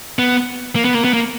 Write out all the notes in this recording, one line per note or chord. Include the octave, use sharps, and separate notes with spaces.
B3
A#3
B3
A#3
B3
A#3